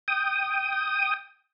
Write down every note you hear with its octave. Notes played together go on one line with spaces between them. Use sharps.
G5 D#6